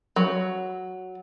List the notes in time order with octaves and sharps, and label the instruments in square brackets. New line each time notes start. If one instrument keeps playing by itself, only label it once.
[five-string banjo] F#3